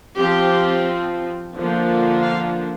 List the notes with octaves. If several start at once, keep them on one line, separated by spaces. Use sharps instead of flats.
F3 C4 G4
D3 F3 A#3 D4
F5